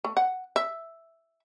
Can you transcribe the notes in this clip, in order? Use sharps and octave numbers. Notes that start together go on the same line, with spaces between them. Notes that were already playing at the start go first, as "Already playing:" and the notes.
A3
F#5
E5